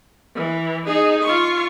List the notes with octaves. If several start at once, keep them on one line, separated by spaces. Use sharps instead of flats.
E3
D#4 G#4
F4 C#6